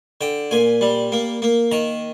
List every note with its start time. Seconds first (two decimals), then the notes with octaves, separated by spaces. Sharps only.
0.21 D3 G5
0.51 A#2 G#5
0.81 G3
1.12 A#3
1.42 A#3
1.71 D#3 A#5